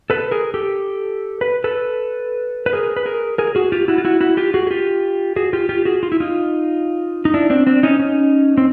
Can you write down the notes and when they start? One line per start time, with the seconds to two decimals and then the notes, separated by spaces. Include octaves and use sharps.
0.10 A4 B4
0.31 G#4 A#4
0.54 G4 A4
1.41 B4
1.64 A4 B4
2.66 B4
2.73 G#4 A#4
2.96 B4
3.05 G#4 A#4
3.38 G#4 A#4
3.55 F#4 G#4
3.72 F4 G4
3.88 E4 F#4
3.98 F4
4.05 E4 F#4
4.21 E4 F#4
4.37 F4 G4
4.54 F#4 G#4
4.67 G#4
4.71 F4 G4
5.36 F#4 G#4
5.53 F4 G4
5.69 F4 G4
5.85 F#4 G#4
6.03 F4
6.12 E4
6.20 D#4 F4
7.25 D#4
7.34 D4 E4
7.50 C4 D4
7.67 C4 D4
7.83 C#4 D#4
7.99 C#4 D#4
8.57 C4